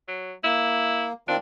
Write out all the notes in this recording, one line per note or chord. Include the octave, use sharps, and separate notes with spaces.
F#3
A#3 E4
D#3 C4 D4 F4